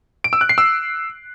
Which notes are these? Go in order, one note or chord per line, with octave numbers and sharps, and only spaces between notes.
D7
E6
F#6
C7
E6